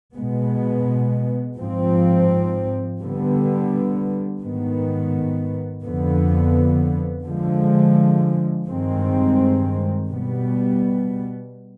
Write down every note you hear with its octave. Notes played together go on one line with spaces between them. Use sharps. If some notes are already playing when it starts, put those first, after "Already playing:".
B2 G#3 B3
G#2 F3 C4
D3 G3 B3
G#2 D#3 B3
F2 D3 F3 B3
D3 F3 G#3
G2 D#3 G#3 C4
B2 G3 B3